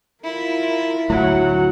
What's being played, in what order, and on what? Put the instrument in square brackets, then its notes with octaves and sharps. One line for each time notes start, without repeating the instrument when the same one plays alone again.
[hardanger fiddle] E4 [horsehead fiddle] F4 A#4
[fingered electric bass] D2 A2 [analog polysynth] F#3 [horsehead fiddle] F#5